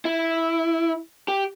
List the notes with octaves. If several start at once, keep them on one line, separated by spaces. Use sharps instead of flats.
E4
G4